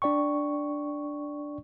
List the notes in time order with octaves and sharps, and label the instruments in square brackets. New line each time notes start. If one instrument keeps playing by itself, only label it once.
[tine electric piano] D4 D5 G5 C#6